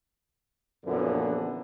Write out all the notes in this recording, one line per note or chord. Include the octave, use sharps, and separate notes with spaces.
A#1 F#2 A#2 D3 E3 B3